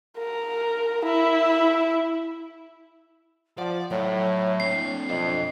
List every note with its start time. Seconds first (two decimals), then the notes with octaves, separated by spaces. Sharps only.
0.18 A#4
1.05 E4
3.58 F3 D5 F#5
3.91 A2 F#3 C#5
4.60 C4 D4 C7
5.09 B1 F2 D4 D#5